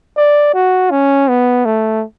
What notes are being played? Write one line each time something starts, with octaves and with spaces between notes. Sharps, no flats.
D5
F#4
C#4
B3
A3